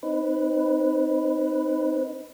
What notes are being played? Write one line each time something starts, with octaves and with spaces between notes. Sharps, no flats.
C4 D#4 B4